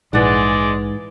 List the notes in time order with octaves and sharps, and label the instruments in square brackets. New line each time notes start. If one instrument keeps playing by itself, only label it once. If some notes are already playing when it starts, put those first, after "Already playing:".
[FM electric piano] A#1 [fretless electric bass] G#2 [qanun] E3 F#5 [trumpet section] G#3 D5